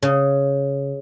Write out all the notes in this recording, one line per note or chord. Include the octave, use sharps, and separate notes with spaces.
C#3